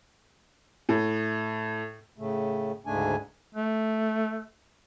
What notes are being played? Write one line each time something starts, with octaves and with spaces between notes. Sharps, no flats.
A2
A2 C#3 A3
D2 G#2 C#3 A3 D4 G#5
A3